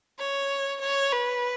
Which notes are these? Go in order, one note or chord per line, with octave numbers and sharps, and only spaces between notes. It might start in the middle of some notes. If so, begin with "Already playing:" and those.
C#5
C#5
B4